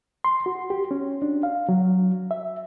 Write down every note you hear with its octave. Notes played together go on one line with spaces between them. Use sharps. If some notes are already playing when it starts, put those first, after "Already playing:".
C6
F#4
G4
C#4
D4
F5
F#3
E5